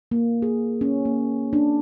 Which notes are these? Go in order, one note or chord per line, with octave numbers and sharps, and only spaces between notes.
A#3
G#4
C#4
A#3
D4